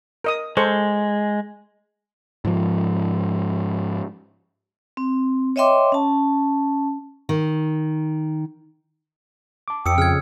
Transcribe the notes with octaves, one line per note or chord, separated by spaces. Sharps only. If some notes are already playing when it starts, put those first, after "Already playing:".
A#4 D#5 D#6
G#3 A4 C5 C#6
G#2 F3
C4
C#5 D#5 E5 G5 C6 D6
C#4 A5
D#3
A5 D6
F2 G5 D#6 E6 C#7
C#3 F4 F6 G#6